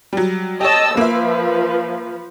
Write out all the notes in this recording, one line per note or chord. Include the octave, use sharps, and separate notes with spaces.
F#3 G3
G4 C#5 D#5 A5 E6
F3 A#3 B4 E5